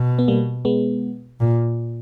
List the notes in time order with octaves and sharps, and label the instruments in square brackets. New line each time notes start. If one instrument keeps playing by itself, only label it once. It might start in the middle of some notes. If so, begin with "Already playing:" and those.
Already playing: [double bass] B2
[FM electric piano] B3
G3 A#3
G#3 B3
[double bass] A#2